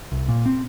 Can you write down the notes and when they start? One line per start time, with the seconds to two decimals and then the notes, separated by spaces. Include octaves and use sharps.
0.12 C2
0.28 A#2
0.46 C4